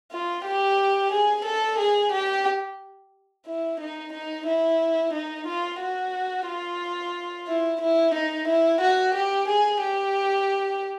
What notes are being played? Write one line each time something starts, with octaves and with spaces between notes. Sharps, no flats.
F4
G4
G#4
A4
G#4
G4
E4
D#4
D#4
E4
D#4
F4
F#4
F4
E4
E4
D#4
E4
F#4
G4
G#4
G4